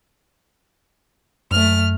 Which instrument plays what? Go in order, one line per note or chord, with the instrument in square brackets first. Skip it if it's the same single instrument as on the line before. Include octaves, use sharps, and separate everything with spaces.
[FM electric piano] F#2 [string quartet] A3 F6